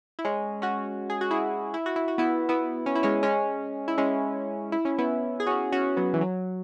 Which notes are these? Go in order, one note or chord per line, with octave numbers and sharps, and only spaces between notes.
E4
G#3 C#4
C#4 F#4
G#4
F#4
E4 G#4
E4
F#4
E4
F#4
B3 E4
B3 E4
C#4
E4
G#3 C#4
G#3 C#4
E4
G#3 C#4
E4
C#4
B3 E4
G#4
C#4 F#4
C#4 F#4
F#3 B3
E3
F#3